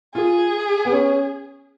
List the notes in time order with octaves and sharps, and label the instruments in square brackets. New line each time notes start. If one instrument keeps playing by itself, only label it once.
[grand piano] F4 [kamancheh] G#4
[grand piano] B3
C#4